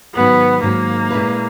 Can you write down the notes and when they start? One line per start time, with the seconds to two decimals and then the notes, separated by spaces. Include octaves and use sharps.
0.15 G#2 D#3 F#3 B3 C#4
0.62 G#2 D#3 F#3 A#3 C#4
1.10 A#2 G#3 C#4 E4 B4